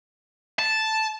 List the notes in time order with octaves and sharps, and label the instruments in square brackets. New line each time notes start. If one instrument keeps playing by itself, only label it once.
[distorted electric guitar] A5